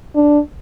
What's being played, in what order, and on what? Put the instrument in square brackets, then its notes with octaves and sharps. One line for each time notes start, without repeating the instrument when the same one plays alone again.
[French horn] D4